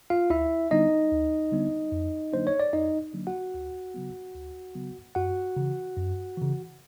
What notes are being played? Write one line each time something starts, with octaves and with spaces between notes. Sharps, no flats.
F4 F5
D2 E4 E5
D3 G3 B3 D4 D#4 D#5
D2
D3 G3 B3 D4
F2
D3 F#3 A#3 D4 C5
C#5
D5
F2 D#4 D#5
D3 F#3 A#3 D4
F#4 F#5
D2
C#3 F#3 B3
D2
C#3 F#3 B3
F#2 F#4 F#5
C#3 E3
F#2
C#3 E3